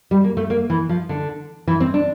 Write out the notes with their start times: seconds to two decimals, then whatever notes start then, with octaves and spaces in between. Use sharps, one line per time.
0.11 G3
0.24 A#3
0.37 A3
0.50 A#3
0.70 E3
0.89 F3
1.09 D3
1.67 E3
1.80 C4
1.94 D4